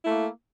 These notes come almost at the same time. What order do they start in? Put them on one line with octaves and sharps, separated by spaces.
E4 A3 A#3